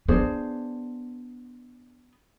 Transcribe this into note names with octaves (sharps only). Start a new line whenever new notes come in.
B3 D4 G#4 C5